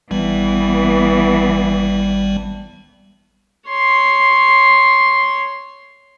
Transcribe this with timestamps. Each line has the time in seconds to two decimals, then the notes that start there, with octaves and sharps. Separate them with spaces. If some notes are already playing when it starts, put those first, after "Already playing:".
0.11 G#1 E3 G3 B3
3.70 C#5 C6